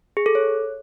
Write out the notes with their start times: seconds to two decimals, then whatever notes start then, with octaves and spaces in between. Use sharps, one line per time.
0.17 G#4
0.26 A4
0.35 C#5